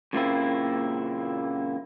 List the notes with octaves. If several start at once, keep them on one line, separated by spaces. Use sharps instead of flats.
F#2 A#2 C#3 A#3 C4 E4